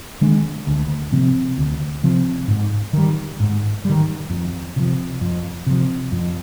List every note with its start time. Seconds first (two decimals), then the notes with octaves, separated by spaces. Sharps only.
0.21 D#3 G#3 D4
0.67 D2
1.12 C3 F3 C4
1.58 D2
2.03 C3 F3 C4
2.48 G#2
2.93 D#3 G3
3.40 G#2
3.85 D#3 G3
4.30 F2
4.76 C3 F3
5.21 F2
5.66 C3 F3
6.12 F2